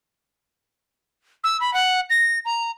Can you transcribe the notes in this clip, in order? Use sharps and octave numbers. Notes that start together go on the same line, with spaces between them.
E6
B5
F#5
A#6
A#5